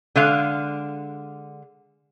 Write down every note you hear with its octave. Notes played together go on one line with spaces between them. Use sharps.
D3 G#3 F5